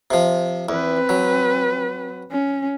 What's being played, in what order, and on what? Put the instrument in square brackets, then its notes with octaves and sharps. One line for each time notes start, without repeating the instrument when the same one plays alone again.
[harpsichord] C3 F3
[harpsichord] E2 [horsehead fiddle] C4 B4
[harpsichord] F#3
[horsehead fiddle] C#4